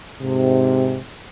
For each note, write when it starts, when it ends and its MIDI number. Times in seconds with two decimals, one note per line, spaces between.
0.22 0.99 44
0.22 0.99 48